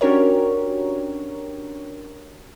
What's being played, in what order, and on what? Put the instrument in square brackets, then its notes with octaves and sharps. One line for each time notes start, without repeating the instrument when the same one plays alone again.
[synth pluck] C#4 D4 F#4 G4 A#4 C#5